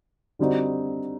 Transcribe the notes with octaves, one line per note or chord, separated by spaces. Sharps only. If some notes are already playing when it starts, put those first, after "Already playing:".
D3 G3 C4 D#4 F#4